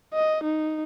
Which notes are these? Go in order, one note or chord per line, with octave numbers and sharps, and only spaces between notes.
D#5
D#4